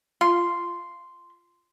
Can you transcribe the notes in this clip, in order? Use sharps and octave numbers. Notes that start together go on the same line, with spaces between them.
F4 C6